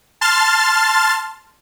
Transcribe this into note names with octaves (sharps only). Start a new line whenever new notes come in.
A5 C6 F6 A6